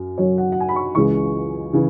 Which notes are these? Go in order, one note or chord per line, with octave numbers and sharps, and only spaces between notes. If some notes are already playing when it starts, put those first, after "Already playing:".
Already playing: F#2 F#3
F#2 F#3 C#5
F#5
F#5
G#5
B5
C#6
C#2 C#3 E3 G#3 C#6
C#3 E3